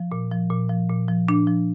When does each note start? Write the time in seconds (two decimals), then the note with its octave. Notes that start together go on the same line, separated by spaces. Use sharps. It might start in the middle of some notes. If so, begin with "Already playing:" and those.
Already playing: F3
0.12 A#2
0.31 F3
0.51 A#2
0.69 F3
0.89 A#2
1.09 F3
1.28 A#2 D4
1.47 F3